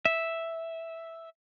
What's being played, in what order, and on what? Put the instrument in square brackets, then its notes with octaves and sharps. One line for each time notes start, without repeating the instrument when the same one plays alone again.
[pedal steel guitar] E5